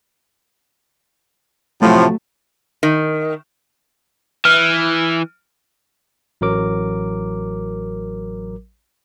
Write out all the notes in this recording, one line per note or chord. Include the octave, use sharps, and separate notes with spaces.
A2 C3 F3 F#3 A3
D#3
E3 F6
A1 F#3 A#4 D6